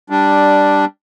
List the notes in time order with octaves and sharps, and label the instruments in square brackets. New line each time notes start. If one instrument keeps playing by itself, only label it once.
[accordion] G3 D4